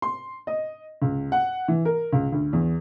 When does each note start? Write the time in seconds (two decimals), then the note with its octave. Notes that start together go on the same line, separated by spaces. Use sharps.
0.02 C6
0.47 D#5
1.02 C#2
1.32 F#5
1.68 E3
1.85 A#4
2.13 C#2
2.32 D2
2.53 E2